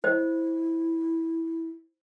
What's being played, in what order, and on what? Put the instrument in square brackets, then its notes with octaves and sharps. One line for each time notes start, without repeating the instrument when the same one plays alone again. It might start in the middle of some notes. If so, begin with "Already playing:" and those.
[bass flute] E4 [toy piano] C5 D#5